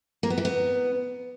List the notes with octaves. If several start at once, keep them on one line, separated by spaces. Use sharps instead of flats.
A#3
B3
E3
B3